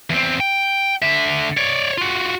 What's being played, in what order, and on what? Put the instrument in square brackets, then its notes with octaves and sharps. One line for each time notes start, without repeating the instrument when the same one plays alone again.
[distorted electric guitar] E2 C4
G5
D3 E5
C#5 D5
F4 F#4